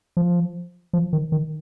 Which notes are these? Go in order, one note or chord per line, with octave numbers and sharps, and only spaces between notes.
F3
F3
D#3
D#3